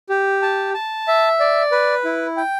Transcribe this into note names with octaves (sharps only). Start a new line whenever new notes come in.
G4
A5
A5
E5
D5
B4
E4
G5